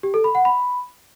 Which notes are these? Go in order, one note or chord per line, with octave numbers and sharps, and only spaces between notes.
G4
A4
B5
F#5
B5